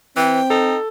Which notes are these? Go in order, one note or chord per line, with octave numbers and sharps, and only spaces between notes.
E3 C4 G5
D#4 A4